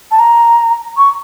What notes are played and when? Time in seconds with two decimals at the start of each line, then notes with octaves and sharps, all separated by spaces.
0.11 A5
0.19 A#5
0.97 C#6